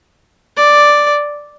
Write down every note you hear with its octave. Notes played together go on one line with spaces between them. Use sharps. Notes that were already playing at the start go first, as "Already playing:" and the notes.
D5